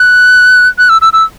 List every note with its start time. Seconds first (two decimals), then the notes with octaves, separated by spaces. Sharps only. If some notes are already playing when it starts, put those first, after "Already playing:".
Already playing: F#6
0.78 F#6
0.89 E6
1.02 E6
1.13 E6